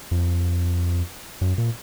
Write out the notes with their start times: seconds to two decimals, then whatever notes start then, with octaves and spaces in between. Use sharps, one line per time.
0.11 F2
1.41 F#2
1.58 A#2